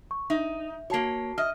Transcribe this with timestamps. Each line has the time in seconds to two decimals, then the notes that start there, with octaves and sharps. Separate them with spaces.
0.11 C#6
0.30 D#4 E5
0.90 A#3 F#4 C#5 A5 C7
1.38 D#5 E5 F6